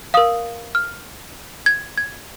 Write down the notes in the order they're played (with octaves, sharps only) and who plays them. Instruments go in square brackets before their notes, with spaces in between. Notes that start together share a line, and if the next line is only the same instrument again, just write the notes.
[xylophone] A#4 F5 D#6
F6
G#6
G#6